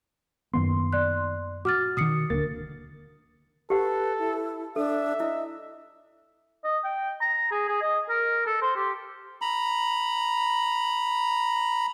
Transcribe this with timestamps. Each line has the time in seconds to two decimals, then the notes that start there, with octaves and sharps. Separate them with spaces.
0.54 F#2 D#3 A#3 B3 C6
0.93 D5 F#6
1.65 F#4 D6 F6 A6
1.97 B2 D#3 D#6 C7 C#7
2.30 D1 D3 A#3 A#4 A6
3.70 G4 A4 B4 F#5
4.19 E4
4.76 D4 A4 E5
5.20 E4 D#5
6.64 D#5
6.84 G5
7.21 A#5
7.51 G#4
7.68 G#4
7.82 D#5
8.09 A#4
8.46 A4
8.62 C5
8.76 G4
9.42 A#5 B5